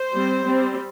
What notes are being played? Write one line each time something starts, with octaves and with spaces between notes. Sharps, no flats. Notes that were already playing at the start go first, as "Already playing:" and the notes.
Already playing: C5
G3 C4
G3 C4